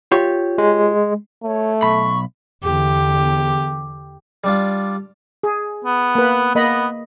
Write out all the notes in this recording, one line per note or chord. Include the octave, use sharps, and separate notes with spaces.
F4 G4 C#5
G#3
A3 C#5
B1 B5 C#6
E2 D3 G4
G3 D4 F4
G#4
B3
A#3 B4
A#3 B3 D#5 B5